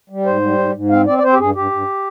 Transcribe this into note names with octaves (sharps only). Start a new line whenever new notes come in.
G3
G#2 C5
G3
G#2
G#2
C4 F5
C4 D5
D5
C4 C5
G4
G2 G#4
G2 G4
G2